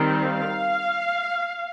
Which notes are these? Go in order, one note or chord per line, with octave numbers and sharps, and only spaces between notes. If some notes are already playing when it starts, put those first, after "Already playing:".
Already playing: D#3 G3 C4
F5